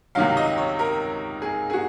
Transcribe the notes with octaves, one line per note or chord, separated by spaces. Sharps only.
C#2 C3 D#3 F#3 F5
D#5
C#5
A#4
G#4
G#4
F#4